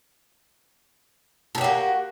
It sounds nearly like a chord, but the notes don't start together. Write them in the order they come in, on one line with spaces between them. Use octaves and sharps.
A4 G4 F#4 A#3